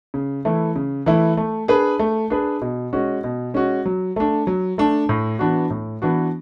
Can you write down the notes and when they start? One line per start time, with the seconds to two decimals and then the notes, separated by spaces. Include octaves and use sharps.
0.14 C#3
0.45 E3 A3 E4
0.76 C#3
1.06 E3 A3 E4
1.37 A3
1.68 D4 G#4 B4
1.99 A3
2.30 D4 G#4 B4
2.62 B2
2.93 G#3 C#4 F#4
3.24 B2
3.54 G#3 C#4 F#4
3.86 F#3
4.16 A3 D4
4.47 F#3
4.78 A3 D4
5.09 A2
5.39 E3 B3 D4 F#4
5.70 A2
6.02 E3 B3 D4 F#4